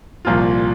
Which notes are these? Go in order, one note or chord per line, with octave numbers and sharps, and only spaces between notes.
C2 A#2 F3 A#3 F4